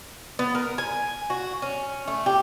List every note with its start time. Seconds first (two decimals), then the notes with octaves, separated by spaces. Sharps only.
0.39 B3
0.55 A#4
0.78 G#5
1.30 F#4
1.62 C#4
2.08 A3
2.26 G4